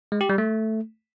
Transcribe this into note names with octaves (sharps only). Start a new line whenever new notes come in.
G#3
G4
G3
A3